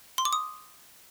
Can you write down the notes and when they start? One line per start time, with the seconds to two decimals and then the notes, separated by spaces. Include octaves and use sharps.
0.18 C6
0.25 D6
0.33 D#6